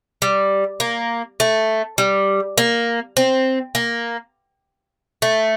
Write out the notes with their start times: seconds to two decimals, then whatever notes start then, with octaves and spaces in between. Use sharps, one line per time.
0.22 G3
0.80 A#3
1.40 A3
1.98 G3
2.58 A#3
3.17 C4
3.75 A#3
5.22 A3